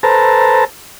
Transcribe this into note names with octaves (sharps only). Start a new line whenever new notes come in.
A4 B4 C5 A5 A#5